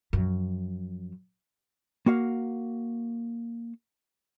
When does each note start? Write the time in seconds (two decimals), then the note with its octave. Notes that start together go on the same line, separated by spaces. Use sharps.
0.13 F#2 F3
2.06 A#3 F#4 F5